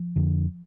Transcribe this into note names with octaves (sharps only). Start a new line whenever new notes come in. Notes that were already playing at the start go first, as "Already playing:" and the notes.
Already playing: F3
F2 D3